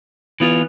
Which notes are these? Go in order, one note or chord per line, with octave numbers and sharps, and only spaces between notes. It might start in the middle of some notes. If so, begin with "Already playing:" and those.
E3 B3 F4